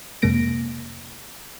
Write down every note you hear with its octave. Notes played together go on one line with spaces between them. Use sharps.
F2 C3 G#3 A#3 A#6 D7